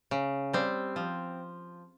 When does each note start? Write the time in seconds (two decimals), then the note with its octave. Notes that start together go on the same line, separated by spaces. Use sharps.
0.11 C#3
0.53 G3 C4
0.96 F3